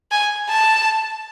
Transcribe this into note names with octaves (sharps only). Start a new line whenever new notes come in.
G#5
A5